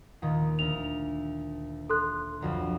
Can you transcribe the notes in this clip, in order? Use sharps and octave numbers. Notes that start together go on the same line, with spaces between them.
D#2 A#2 D#3
D2 F7
A4 C6 F#6
B1 F2 D3